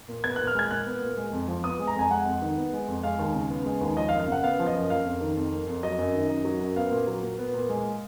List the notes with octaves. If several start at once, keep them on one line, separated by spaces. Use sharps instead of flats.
A#2
B3 G#6
A#2 F#6
F6
G#3 G#6
A#2 F#6
B3
A#2
G#3
F2
F3
B3 D#6
G#3
A#5
F2 G#5
G#3 F#5
F2
D#3
B3
G#3
F2
G#3 F5
D#2
C#3
B3
G#3
D#2
F3 D#5
F5
F#2
F5
C#3 F#5
B3 F5
F3
D#5
F#2
A#3 F5
F2
D#3
F2
A#3
F2
F#3 D#5
F#2
D#3
F#2
F#3
F#2
B3 F5
A#2
F#3
A#2
B3
A#2
G#3